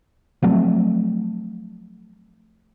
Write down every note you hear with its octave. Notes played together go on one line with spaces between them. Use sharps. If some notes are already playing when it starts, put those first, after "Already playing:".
F3 F#3 A3 C4